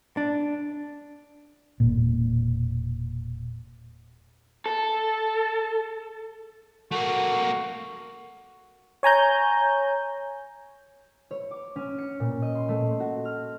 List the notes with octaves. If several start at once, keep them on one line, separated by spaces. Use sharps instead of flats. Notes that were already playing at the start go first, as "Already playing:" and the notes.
D4
E1 A#2
A4
A3 A#3 F#4
C#5 G#5 A#5 G6
C#5
D6
C#4
C#7
A#2
D#5
C6
A3
F#4
F6